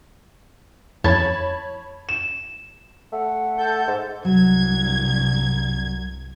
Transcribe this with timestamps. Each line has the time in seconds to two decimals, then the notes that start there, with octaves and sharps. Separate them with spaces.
1.04 F2 C#5 A5 B5 G#6
2.09 E7
3.12 A3 F#5
3.58 A4 G6
3.87 G#2
4.25 C2 G2 F#3 G#6